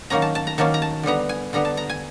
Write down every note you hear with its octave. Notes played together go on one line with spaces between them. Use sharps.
D#3 F#3 A#3 C#4 A#5
A5
A5
A#5
D#3 F#3 A#3 C#4 A5
A#5
A5
D3 G3 B3 A#5
G#5
D3 G3 B3 A#5
A5
A#5
G#5